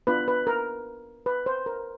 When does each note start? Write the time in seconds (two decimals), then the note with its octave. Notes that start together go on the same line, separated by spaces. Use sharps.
0.07 B3 D4 F4 B4
0.28 B4
0.47 A#4
1.26 B4
1.46 C5
1.66 A#4